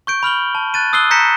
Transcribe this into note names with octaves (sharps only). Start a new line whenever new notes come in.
C#6 G6 D7
B5 F6 F#7 G7
A5
F#6 A6 D#7
D#6 E6 F#6 C7 D#7 G7
A#5 G6 A#6 B6 C#7 E7